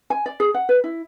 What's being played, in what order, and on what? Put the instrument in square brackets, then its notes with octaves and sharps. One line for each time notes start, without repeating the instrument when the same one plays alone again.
[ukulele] G#5
D5
G#4
F#5
B4
E4